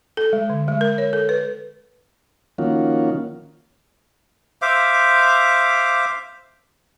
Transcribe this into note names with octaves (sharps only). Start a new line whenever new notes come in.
A4
G#3
D3
G#3
A#4
C#5
A4
B4
D#3 F3 A#3 C#4 F4 F#4
C5 E5 F5 D6